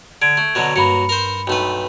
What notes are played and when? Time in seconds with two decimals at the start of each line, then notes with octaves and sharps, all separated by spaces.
0.22 D3 G#6 D7
0.37 A3
0.55 B2 D3 F#3
0.76 G2 F#3 A#3 B5 C#7
1.09 A#4 C5
1.47 B1 A3 B3 D#4 B4 G5